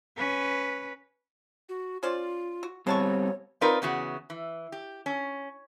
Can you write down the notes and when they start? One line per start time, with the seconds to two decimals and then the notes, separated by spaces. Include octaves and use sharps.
0.17 C#4 B4
1.69 F#4
2.03 C#4 F4 C5 D5
2.63 F#4
2.87 G3 G#3 B3 C4 C#5 A5 C#6
3.61 C4 D#4 F4 A#4 B4 D5
3.82 E2 C#3 B3 F#4
4.30 E3
4.72 G4
5.06 C#4